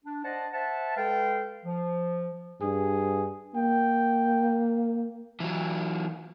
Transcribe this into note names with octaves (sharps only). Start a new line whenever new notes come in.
D4
C5 D5 D#5 F#5 A5
C5 E5 F#5 A5
G#3 A4 B4 F5 G5
F3
G2 G#4
A#3 G5
E3 F#3